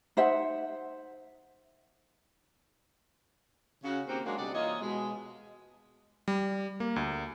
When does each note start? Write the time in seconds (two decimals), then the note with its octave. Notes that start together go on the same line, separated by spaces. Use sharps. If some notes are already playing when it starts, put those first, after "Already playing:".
0.17 D#4 C5 E5 F#5
3.84 C#3 F#4 F5
4.08 D#3 A#3 C4 F#4 G4 C5
4.25 F#3 G#3 A#3 D4 F#4
4.38 D2 C3 G3 D5 D#5 F#5
4.54 E3 A#3 F4 C#5 D#5
4.81 B2 G#3
6.28 G3
6.80 A#3
6.96 D2